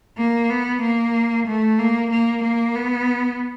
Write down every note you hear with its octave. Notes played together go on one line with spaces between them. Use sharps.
A#3
B3
A#3
A3
A#3
A#3
A#3
B3